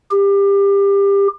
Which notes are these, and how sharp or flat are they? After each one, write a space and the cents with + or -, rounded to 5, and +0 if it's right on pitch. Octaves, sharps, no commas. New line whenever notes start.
G4 +25